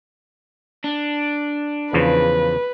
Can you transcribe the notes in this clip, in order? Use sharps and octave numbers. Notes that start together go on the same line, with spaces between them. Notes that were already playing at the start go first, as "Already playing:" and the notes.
D4
E2 C#3 F3 B4